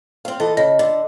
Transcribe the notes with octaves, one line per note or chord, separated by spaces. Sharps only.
C4 F5
E3 A4 D#5
C#3 D#5
D3